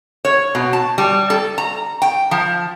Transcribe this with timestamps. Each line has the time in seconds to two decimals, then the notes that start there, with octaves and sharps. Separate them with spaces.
0.25 C#5
0.55 B2
0.73 A5
0.98 G3
1.30 A4
1.58 A#5
2.02 G5
2.31 F3